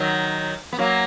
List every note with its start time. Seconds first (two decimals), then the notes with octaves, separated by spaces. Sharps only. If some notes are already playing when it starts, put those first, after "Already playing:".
Already playing: D#3 F#3
0.73 B3
0.79 F#3 A#3